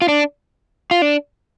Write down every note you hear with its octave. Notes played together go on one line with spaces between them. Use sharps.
F4
D4
F4
D4